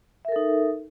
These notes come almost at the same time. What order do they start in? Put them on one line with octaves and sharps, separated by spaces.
E5 A#4 A4 D#4